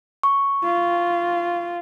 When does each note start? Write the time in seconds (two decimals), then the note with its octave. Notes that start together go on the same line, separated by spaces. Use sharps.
0.23 C#6
0.64 F4